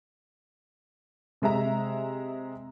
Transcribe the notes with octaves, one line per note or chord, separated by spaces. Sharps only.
C3 G#3 E5 A#5